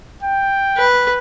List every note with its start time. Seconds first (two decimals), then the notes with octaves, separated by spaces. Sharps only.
0.23 G5
0.77 B4